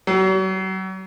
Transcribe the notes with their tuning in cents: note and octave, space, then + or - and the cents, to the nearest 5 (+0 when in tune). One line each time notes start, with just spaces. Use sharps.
F#3 +40